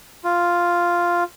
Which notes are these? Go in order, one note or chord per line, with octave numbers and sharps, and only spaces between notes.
F4